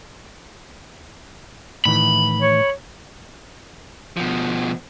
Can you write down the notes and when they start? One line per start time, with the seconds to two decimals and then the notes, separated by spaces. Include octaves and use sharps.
1.85 A2 D#3 E3 B5
2.42 C#5
4.17 B2 F3